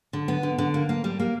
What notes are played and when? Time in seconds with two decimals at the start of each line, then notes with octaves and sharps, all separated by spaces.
0.13 D3
0.28 B3
0.43 D3
0.58 D3
0.74 A#3
0.89 A#3
1.04 G3
1.20 A#3